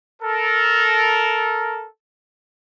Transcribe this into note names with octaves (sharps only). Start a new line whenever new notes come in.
A4 A#4